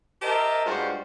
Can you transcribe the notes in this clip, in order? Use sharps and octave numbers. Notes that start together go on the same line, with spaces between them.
G4 A#4 C5 D#5 E5 A5
G2 G3 G#3 F4 F#4 C5